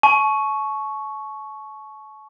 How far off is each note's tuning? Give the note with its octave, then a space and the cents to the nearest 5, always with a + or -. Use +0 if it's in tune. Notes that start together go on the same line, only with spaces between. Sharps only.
A5 -40 C#6 +0